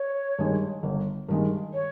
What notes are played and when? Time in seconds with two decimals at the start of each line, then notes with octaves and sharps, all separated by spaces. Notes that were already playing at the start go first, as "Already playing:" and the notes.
Already playing: C#5
0.39 G2 D#3 G#3
0.83 G1
1.29 G2 D#3 G#3
1.73 C#5